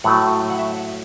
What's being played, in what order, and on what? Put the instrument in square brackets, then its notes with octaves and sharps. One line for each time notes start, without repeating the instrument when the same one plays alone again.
[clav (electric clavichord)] A2 F#3 A3 F#5
F#5
E5
F#5